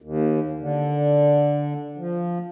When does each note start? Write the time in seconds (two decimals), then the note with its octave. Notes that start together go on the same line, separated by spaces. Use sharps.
0.02 D#2
0.60 D3
1.97 F3